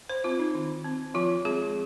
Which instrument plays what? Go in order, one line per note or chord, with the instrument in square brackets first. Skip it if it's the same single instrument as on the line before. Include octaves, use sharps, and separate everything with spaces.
[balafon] C5
C4 F4
D#4
D#3
C4
F3 F4
G#3 C4 G#4